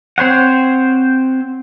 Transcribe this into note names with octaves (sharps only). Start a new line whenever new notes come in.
C4 C5 C#5 F#5